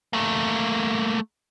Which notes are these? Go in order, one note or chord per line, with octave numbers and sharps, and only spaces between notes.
A3 A#3